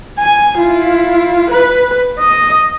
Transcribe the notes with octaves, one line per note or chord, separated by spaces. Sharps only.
G#5
E4 F4
B4
D#5